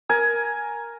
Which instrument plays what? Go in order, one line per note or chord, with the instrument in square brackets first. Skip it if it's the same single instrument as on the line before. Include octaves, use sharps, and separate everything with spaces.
[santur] A#4 G#5